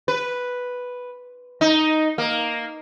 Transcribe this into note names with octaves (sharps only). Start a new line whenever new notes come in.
B4
D#4
A#3